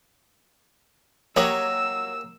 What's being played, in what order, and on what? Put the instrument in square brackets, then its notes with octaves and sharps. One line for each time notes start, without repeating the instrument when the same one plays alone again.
[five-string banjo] F#3 C#5 A#5 [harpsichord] A#3 G4 D#5 [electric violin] E6